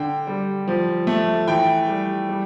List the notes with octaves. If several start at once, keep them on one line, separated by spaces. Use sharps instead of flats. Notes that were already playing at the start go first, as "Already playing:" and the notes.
Already playing: D3 G5
G3
F3
A3
E3 G5
G3
G3